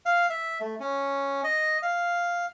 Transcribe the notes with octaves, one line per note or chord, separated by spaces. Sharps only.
F5
E5
A3
C#4
D#5
F5